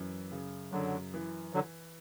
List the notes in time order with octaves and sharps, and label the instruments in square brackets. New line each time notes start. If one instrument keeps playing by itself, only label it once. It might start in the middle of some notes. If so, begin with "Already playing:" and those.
Already playing: [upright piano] F#2 E3
C#3
[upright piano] F#2 [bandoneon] D3 F#3
[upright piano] E3
[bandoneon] D3 F#3